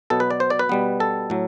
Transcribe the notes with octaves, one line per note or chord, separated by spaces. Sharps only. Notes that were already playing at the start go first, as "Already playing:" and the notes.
B2 F#3 B3 A4
B4
D5
C5
D5
B4
B2 G3 B3
A4
A2 F#3